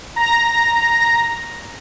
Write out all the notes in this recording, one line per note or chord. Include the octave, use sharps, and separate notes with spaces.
A#5 A#6